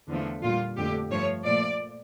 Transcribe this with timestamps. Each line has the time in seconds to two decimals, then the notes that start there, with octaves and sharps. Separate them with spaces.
0.09 E2 D3 F3 A3
0.42 A#2 G3 F4
0.77 F2 D3 A3 G4
1.10 G2 F3 A3 C#5
1.44 A#2 F3 A3 D5